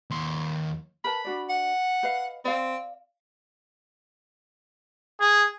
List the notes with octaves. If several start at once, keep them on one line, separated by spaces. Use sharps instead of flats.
D#2 C6
A#4 B4 A5 B5
D4 F#4 D5
F#5
B4 D#5 F5
C4 D5 F5
G#4